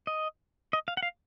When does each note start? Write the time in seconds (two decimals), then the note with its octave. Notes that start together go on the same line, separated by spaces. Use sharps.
0.07 D#5
0.73 D#5
0.88 F5
0.97 F#5
1.03 F5